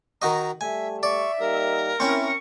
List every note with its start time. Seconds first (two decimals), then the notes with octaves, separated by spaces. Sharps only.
0.22 D#3 F#4 D#5 A#5
0.61 G3 A3 E5 G#5
1.03 D5 E5 C#6
1.40 G3 A#3 D#4 A#4
2.00 A#3 C4 C#4 E4 C#6